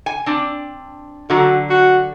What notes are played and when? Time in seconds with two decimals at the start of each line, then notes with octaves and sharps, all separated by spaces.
0.06 G#5
0.26 C4 D4
1.30 D3 F#3 F#4
1.70 F#4